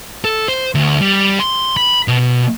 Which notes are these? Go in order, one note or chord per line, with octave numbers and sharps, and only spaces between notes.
A4
C5
D2
G3
C6
B5
B2